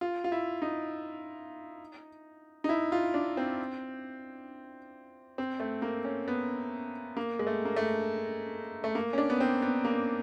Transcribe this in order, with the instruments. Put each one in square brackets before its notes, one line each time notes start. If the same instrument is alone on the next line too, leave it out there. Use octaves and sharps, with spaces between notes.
[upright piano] F4
F4
E4
D#4
D#4
E4
F4
D4
C4
C4
A3
A#3
C#4
B3
A#3
G#3
A3
A#3
A3
A3
A#3
C#4
D4
B3
C4
B3
A#3